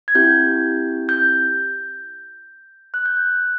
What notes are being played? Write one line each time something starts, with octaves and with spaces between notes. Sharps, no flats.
G#6
C4 E4 G4 G6
G6
F#6
G6
F#6